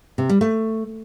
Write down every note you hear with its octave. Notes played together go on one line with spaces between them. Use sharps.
C3
G3
A3